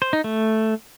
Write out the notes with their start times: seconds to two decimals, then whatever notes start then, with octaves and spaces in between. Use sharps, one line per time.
0.02 C5
0.13 D#4
0.24 A3